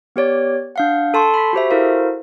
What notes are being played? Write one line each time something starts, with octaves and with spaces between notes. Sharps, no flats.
B3 G4 C#5 D5
D4 F5 F#5
A4 A5 C6 C#6
B5 B6
F#4 G4 C5 E5
E4 F#4 A4 A#4 C5 F5